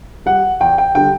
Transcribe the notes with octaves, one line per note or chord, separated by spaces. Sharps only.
G3 F#5
E2 G5
G5
D3 G3 G5